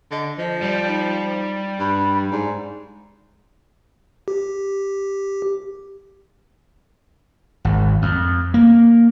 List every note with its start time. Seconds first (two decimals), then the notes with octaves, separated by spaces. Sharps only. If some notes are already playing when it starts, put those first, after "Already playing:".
0.11 D3 D#5
0.39 F3 D#5
0.62 G3 D5
0.87 D#4
1.79 G2 B5
2.32 G#2 D5
4.28 G4
7.65 G#1
8.02 F2
8.54 A#3